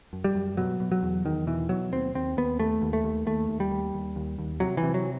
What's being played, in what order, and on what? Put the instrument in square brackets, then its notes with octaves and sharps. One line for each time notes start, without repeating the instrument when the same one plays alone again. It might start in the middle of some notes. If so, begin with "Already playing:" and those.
[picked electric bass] F#2
G3
F#2
B2 F#3
B2
F#3
E2
E2 D#3
B2 E3
B2 F#3
D#2 C4
D#2 C4
D#2 B3
D#2 A3
D#2
A3
D#2
D#2 A3
D#2
G3
D#2
D#2
D#2
D#2
C3 F#3
E3
C3
F#3